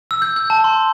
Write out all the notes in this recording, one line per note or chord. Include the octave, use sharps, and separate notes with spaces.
E6
G6
G6
A5
C6